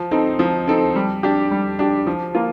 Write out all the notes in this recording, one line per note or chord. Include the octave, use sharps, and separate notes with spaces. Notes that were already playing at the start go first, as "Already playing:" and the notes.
Already playing: F3
C4 D#4 A4
F3
C4 D#4 A4
G3
D4 G4
G3
D4 G4
F3
A#3 F4